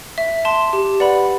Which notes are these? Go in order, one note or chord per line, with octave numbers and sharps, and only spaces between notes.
E5
A5 C6
G4
B4 D5 F#5 B5